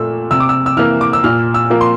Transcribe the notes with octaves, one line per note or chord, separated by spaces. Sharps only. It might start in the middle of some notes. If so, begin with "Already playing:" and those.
Already playing: A#2 A3 E6
C3 E6
D6
E6
E6
E3 A#3 F6
D6
E6
A#2 F6
E6
F3 A#3
C6